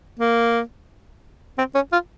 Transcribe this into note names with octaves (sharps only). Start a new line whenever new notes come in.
A#3
C4
C#4
F4